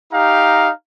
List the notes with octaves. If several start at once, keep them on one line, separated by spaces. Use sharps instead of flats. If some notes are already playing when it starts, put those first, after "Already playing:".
D#4 G4 F5 A#5